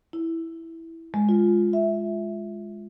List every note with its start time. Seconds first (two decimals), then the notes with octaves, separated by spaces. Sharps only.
0.13 E4
1.14 G#3
1.29 F4
1.73 E5